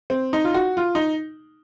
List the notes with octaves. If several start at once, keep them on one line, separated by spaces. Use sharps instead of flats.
C4
D#4
F4
F#4
F4
D#4